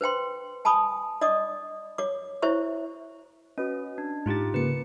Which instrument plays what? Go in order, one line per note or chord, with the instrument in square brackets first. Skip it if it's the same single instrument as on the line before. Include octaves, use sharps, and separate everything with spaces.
[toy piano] B4 C5 G5 C6
G#5 A5 B5 D#6
D5 D#5 D6 D#6
C#5 D6
E4 C5 C#5 E5 C#6
[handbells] C#4 [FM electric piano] F#4 B4 D#5
[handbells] D4
[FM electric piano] G#2 A6 [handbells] D#4 F4 G4
[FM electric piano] C#3 A#3 [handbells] B4 C#7